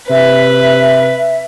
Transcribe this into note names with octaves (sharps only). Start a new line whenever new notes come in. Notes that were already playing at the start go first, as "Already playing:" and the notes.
C3 B4 E5